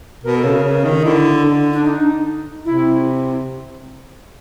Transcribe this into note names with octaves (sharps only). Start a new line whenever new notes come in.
B2 A#4
A4
C#3
A#4
C#3
D#3
D3 E4
D3
D4
D#4
C3 E4